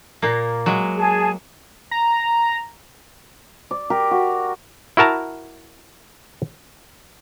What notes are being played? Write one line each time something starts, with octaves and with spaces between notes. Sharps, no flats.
A#2 A#3
F#3 G#3
G#4 A5
A#5
D5
G4 A#4
F#4
E4 F#4 A#4 A5 A#5